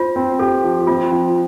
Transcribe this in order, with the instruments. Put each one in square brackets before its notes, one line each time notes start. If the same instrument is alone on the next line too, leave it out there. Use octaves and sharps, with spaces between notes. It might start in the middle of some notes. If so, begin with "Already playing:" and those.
Already playing: [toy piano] F4 [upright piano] C5
[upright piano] C4
[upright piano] G4 [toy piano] A4
[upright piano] F3
[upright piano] C4 [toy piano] F4
[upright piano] F3